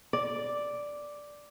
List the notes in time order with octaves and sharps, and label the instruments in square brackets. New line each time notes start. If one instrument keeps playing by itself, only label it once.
[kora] D5